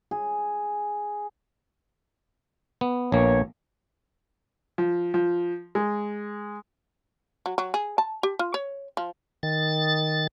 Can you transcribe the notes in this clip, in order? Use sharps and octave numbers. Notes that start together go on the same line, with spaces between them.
G#4
B3
A#1 A#3 B3 C#5
F3
F3
G#3
F#3
F#3
G#4
A5
G4
F4
C#5
F3
D#3 A6